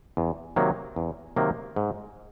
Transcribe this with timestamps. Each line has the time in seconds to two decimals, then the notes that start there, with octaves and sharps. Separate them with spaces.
0.17 E2
0.56 C3 D#3 F#3 A#3
0.96 E2
1.36 C3 D#3 F#3 A#3
1.76 G#2